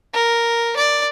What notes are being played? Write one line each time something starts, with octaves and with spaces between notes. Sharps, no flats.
A#4
D5